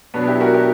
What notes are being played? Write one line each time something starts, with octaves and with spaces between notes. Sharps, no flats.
B2 F#3 B3 D4
E4 G4
F#4 A#4
E4 G4